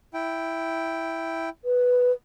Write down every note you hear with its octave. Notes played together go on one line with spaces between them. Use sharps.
E4 G5
B4